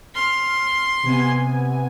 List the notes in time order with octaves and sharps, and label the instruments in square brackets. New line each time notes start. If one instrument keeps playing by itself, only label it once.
[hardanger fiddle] C6 [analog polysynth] F6
[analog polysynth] C3 B3 G#5